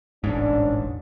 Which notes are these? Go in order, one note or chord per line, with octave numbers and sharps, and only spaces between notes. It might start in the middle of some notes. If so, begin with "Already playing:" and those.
E1 A1 G#2 C#4 D4